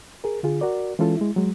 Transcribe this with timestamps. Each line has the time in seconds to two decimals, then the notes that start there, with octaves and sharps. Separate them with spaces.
0.24 G#4 A#4
0.43 D3 F4 G#4
0.61 F#4 A#4 D5
0.99 E3 G#3 C#4 F4 A4
1.17 G#3 E4
1.36 F#3 G#3